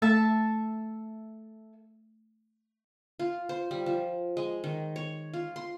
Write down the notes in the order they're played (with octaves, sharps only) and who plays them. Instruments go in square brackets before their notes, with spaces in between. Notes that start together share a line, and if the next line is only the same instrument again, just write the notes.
[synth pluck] A3 [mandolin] A4 E5 A5
[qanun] F4
C5
G3
F3
G#3
D#3
C#5
F4
C6